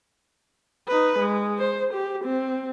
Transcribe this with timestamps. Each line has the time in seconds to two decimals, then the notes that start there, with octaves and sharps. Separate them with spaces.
0.88 D#4 B4
1.19 G#3
1.59 C5
1.94 G4
2.24 C4